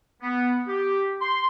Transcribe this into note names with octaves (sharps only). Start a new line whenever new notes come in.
B3
G4
C6